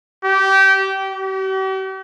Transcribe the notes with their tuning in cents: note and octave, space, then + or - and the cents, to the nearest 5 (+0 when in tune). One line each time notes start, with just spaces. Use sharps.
G4 -20
G4 -45